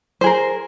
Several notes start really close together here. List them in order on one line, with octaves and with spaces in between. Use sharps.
C5 G#4 A#4